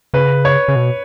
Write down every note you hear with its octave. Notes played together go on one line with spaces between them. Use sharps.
C#3 B4
C#5
C#3
B2